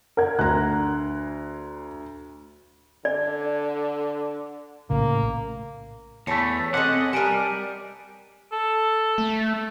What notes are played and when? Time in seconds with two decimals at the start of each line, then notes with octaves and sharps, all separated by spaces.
0.17 A#4 F#5 G#6
0.39 D2 A#5 F#6
3.05 D3 D5
4.90 A#1 A2 C#3 A#3
6.27 E2 A3 C#5 A5 B6 C#7
6.74 C4 C#4 A4 D#5 F#5 D6
7.13 G3 A#4 G#5 A5 D7 D#7
8.52 A4
9.18 A3